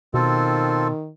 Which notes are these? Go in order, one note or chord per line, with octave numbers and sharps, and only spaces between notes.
B2 D#3 C4 F4 A4